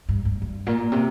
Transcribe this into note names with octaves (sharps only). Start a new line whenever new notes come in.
G2
G2
G2
A#2
C3